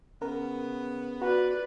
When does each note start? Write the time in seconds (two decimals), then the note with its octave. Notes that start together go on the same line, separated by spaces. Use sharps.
0.22 C#3 B3 A#4
1.21 F#4 B4 D5